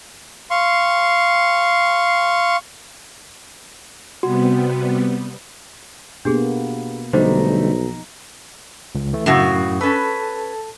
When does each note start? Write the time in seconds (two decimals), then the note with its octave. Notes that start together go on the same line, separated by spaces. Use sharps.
0.51 F5 C6 C#6
4.23 C3 G3 B3 F#4
6.25 B2 A#3 B3 D4 G4 G#4
7.13 B1 D3 F3 G3 A3 D#4 C5
8.95 C#2
9.13 E3 A3
9.26 F#2 A2 C#3 F#4
9.81 C#4 A4 B4 A5